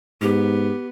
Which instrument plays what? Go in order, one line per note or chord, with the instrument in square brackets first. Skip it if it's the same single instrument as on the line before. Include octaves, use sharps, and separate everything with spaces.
[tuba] G#2 [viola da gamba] B3 [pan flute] G4